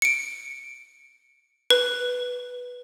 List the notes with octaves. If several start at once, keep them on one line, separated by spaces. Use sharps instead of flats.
C#7 D7
B4